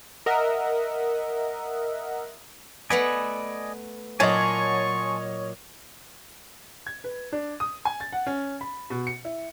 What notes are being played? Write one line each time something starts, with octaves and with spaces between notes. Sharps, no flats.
A#4 D#5 E5 F#5
A3 B3 B4 D5 D#5 G#5
A#2 F#3 C#5 D#5 G#5 A5 C6 C#6
G#6
B4
D4
D#6
G#5
A6
F#5
C#4
B5
B2
C#7
E4